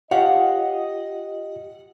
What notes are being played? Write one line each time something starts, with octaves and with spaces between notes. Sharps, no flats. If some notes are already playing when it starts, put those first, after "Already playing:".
F4 G4 C#5 D#5 F5 F#5